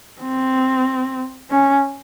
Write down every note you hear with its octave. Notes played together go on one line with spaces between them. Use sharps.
C4
C#4